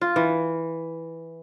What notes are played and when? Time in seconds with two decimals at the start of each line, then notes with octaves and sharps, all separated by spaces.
0.01 F4
0.16 E3